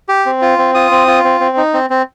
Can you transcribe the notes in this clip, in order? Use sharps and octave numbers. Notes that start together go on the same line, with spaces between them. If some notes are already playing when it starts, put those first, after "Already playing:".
G4
C4
F4
C4
F4 D#6
C4
F4
C4
C4
D#4
C4
C4